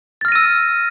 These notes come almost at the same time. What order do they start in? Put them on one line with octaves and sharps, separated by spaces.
A6 F6 A#6 D#7 E6